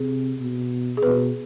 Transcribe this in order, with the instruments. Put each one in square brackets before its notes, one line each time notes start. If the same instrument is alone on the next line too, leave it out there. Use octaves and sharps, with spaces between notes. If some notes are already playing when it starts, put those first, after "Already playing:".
Already playing: [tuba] C3 [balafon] G#4
[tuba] B2
[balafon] G#4
[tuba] B2 [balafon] B4